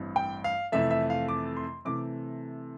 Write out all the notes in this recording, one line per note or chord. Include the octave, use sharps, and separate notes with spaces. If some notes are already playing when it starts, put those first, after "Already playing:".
Already playing: A1 G2 E3 G3 C4
G5
F5
F2 C3 E3 A3 E5
E5
F5
D6
C6
C3 E3 A3 D6